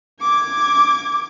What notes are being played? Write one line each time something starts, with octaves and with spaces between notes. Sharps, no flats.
D6 G#6